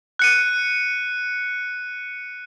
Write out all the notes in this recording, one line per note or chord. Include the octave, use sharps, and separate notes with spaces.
F#6 C#7 D#7